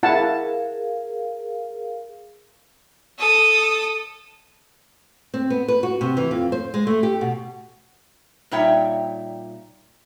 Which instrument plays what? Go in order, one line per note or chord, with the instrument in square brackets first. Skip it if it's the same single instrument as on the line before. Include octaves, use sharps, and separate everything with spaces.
[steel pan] E4 F#5 A5 [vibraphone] G#4 A#4 F5
[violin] A4 D#6
[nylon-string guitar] C4
B3
B4
F#4
C3
E3
F2
C5
G#3
A3
G4
B2
[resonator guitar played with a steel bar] A#2 G3 D#4 C#5 E5 G5